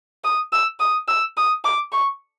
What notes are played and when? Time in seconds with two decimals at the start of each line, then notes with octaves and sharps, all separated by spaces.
0.24 D#6
0.53 E6
0.80 D#6
1.08 E6
1.37 D#6
1.65 D6
1.92 C#6